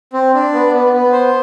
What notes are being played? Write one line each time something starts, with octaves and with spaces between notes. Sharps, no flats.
C4
D4
B3
B3
B3
C5